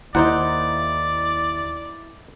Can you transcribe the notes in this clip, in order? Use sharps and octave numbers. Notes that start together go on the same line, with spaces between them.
D#2 D#4 E4 C5 D5 F#5 A#5